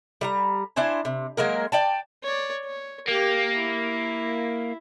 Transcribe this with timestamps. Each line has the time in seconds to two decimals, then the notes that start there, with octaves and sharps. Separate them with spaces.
0.21 G3 F#5 A#5
0.76 D4 E4 C5 G#5
1.05 C3
1.37 F#3 G#3 A#3 A#4
1.72 D5 G5 A5
2.23 C#5 D5
2.65 C#5
3.08 A#3 G4
3.55 E4